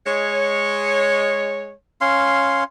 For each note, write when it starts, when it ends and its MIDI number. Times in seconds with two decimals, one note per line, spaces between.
0.06 1.72 56
0.06 1.72 73
2.01 2.64 61
2.01 2.64 77
2.01 2.64 84